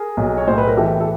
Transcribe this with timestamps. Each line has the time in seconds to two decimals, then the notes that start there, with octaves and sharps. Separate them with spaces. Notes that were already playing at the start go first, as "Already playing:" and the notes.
Already playing: G#4 A#4
0.17 B1
0.37 C#5
0.47 A2 C5
0.58 B4
0.68 A#4
0.77 E3 G4 A4
1.00 A4